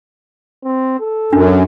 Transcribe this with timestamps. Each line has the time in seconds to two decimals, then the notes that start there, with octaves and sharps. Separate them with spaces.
0.64 C4
1.00 A4
1.33 F#2 D4